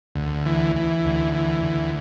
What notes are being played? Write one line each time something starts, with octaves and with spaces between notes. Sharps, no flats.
D2
E3
E3
D2
E3
D2